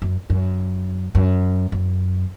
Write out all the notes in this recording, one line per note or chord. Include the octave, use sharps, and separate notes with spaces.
F#2
F#2
F#2
F#2